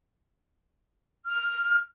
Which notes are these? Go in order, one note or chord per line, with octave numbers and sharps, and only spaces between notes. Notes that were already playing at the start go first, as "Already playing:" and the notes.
F6